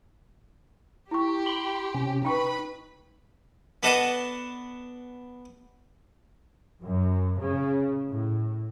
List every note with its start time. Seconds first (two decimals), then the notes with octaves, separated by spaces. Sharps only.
1.11 E4 G4 C#6
1.46 B5 C6
1.94 C3 C#4
2.25 D#4 B4 G5 B5 C#6
3.83 B3 D4 A4 D#5 F#5 A5
6.82 F#2
7.38 C#3
8.08 A2